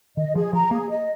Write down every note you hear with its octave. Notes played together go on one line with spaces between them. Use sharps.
D#3 D#5
F3 G#4
F3 A#5
A#3 G#4
D#5